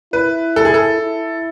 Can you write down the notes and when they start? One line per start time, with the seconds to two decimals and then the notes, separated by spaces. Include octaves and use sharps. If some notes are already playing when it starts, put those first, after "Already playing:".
0.13 E4 B4
0.56 A4
0.65 G#4
0.74 A4
0.99 E4